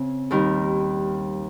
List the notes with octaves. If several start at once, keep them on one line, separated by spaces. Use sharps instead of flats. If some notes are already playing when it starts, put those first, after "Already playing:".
Already playing: C#3 C4
D#2 D#3 G3